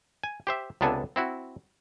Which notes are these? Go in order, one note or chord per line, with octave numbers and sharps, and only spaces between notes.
G#5
G4 C5 E5
C#2 C3 B3 D4 A4 G#5
C4 E4 F#4